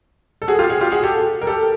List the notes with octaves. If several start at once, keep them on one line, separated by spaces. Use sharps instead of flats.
A4
F#4 G#4
F4 G4
F#4 G#4
F4 G4
F#4 G#4
G4 A4
A#4
G4 A4